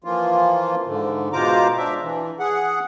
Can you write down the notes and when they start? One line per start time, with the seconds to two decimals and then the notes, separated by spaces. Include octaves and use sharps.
0.04 E3 F3 A#3 F4
0.86 G#2 D3 A3
1.33 B2 G#3 F4 C5 A#5 D6
1.77 D4 E5
2.02 E3
2.40 G#4 F#5